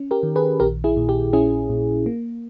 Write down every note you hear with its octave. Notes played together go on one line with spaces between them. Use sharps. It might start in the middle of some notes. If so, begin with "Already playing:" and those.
Already playing: C#4
G4 A#4
D#3
G#4 B4
A#1 G4 A#4
E4 G#4
A#2
G4
C#4 E4 G#4
A#2
A#3